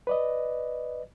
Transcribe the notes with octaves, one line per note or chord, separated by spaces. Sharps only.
B4 D5 D#5